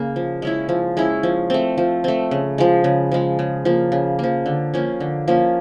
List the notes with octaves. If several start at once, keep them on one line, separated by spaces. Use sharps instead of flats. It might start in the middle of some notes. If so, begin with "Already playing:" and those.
Already playing: C#3 A#3
F3
G#3 C#4 E4
F3
G#3 C#4 E4
F3
A3 C4
F3
A3 C4
C#3
F3 G#3
C#3
F3 G#3
C#3
F3 A#3
C#3
F3 A#3
D3
F3 A#3 C#4
D3
F3 A#3 C#4